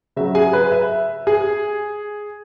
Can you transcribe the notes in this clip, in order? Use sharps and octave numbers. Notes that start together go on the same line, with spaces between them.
C#3 F#3 E5
G#4 G#5
B4 B5
E5
G#4 G#5